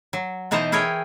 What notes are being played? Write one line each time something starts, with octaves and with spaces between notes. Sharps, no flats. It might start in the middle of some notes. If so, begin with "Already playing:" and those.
F#3
B2 E3 D#4 C5 A5 A#5
E4 G#4 A#4 C#5 G5